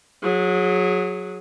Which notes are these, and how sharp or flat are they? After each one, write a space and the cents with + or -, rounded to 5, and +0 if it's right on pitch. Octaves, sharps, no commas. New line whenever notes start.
F#3 -20 G#4 +0